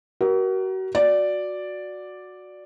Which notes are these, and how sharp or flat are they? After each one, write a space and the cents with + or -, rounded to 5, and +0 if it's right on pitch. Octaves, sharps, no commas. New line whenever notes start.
F#4 +35 A#4 +25
F#4 -15 D5 +0